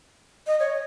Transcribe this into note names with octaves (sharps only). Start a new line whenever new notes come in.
D#5
C#5